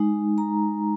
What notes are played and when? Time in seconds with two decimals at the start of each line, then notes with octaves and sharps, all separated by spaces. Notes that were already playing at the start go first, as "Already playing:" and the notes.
Already playing: G#3 D#4
0.38 A#5